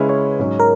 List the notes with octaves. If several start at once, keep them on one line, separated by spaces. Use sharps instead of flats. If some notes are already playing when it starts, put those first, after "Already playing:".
Already playing: C#3 G#3 C#4 E4 B4
C#5
G#2 F#3 C#4
A#4